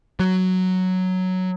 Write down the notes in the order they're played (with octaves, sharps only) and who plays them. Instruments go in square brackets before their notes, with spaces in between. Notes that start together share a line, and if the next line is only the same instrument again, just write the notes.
[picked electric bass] F#3